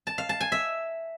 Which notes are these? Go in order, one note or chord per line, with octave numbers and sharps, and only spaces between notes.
A5
F5
A5
G#5
E5